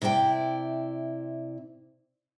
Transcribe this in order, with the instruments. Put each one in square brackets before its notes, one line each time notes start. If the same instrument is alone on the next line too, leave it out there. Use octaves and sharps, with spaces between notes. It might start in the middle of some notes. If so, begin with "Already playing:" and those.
[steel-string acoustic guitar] C3 E4 D5 G5